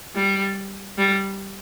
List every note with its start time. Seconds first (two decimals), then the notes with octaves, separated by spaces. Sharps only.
0.15 G3
0.98 G3